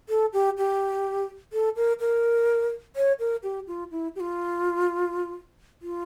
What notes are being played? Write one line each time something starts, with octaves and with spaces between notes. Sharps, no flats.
A4
G4
G4
A4
A#4
A#4
C#5
A#4
G4
F4
E4
G4
F4
F4